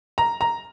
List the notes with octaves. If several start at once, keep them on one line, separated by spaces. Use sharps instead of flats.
A#5
A#5